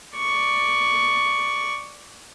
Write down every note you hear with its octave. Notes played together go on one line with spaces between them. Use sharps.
D5 C#6